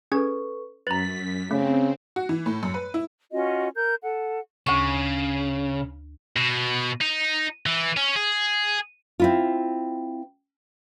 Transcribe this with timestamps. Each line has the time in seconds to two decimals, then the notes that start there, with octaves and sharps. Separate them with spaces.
0.12 C#4 G#4 A4 B4 C#6 G#6
0.87 F#2 B4 A#5 A6 B6 F#7
1.51 C#3 A3 C4
2.16 F#4
2.29 E3
2.46 A2
2.63 F#2
2.74 B4
2.94 E4
3.32 C#4 F4 F#4 D#5
3.75 A#4 G6
4.03 A4 F#5
4.67 D2 C#3 C#6
6.36 B2
7.01 D#4
7.66 E3
7.97 C#4
8.16 G#4
9.20 C4 E4 F4